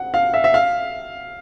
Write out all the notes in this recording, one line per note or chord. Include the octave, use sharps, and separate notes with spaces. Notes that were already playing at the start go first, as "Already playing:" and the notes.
Already playing: F#5
F5
E5
E5
F5